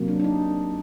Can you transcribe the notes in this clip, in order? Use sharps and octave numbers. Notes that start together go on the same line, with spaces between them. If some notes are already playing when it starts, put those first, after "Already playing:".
Already playing: C3 F#3 A#3
D4
D4
D#4